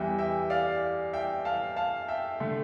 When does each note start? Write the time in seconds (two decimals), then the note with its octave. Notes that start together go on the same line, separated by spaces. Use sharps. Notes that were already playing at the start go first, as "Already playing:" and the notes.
Already playing: E2 E3 G3 E5 G5
0.18 E5 G5
0.50 D5 F5
1.13 E5 G5
1.45 F5 A5
1.76 F5 A5
2.08 E5 G5
2.40 D3 A3